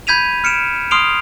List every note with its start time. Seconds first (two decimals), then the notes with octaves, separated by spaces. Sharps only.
0.07 B5 G6 G#6 B6 D#7 F7
0.44 F6 C#7 D7 E7
0.91 C6 D#6 F6 C7 D7 F7